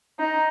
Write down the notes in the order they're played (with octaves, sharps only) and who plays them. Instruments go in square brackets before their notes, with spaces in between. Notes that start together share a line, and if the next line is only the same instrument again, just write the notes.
[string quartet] D#4